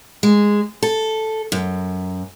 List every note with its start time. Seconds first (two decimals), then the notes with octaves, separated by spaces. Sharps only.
0.23 G#3
0.83 A4
1.52 F#2